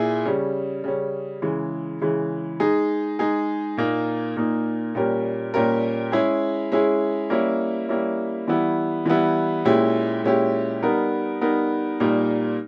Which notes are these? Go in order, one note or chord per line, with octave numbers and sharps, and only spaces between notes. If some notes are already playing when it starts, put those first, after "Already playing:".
Already playing: A#2 E4 G#4
C#3 G3 C#4
C#3 G3 C#4
C#3 E3 G#3
C#3 E3 G#3
G#3 D#4 G#4
G#3 D#4 G#4
A#2 A#3 D#4
A#2 A#3 D#4
A#2 G3 C#4 G4 A#4
A#2 G3 C#4 G4 A#4
G#3 C#4 E4 G#4
G#3 C#4 E4 G#4
G3 A#3 C#4 E4
G3 A#3 C#4 E4
E3 G3 B3 E4
E3 G3 B3 E4
A#2 G#3 C#4 E4 G4
A#2 G#3 C#4 E4 G4
G3 B3 D#4 A#4
G3 B3 D#4 A#4
A#2 G3 A#3 D#4